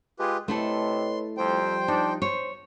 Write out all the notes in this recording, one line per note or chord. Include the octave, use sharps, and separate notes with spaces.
G#3 F4 G4 B4
C3 A3 E4 A4 B4 C#5 D#5 C6
F2 F3 G3 C5 G5
D4 D#4
C5 C#5